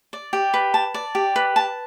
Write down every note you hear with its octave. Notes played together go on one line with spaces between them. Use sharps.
D5
G4
B4
A5
D5
G4
B4
A5